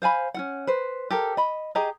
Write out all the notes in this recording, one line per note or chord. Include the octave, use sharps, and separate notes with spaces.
C5 F5 G#5 B5
C#4 F4 F#5
B4 C5
G4 A4 A#4
D#5 B5
G4 G#4 D#5 A#5